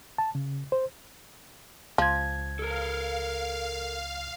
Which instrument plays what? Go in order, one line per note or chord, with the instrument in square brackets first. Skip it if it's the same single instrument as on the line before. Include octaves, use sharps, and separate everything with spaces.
[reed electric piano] A5
C#3
C5
[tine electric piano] C#2 G#6 [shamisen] F3
[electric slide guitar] A4 A#4 [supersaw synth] F5